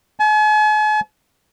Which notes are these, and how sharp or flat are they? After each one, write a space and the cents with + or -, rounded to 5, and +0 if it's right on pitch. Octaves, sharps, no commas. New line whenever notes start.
G#5 +45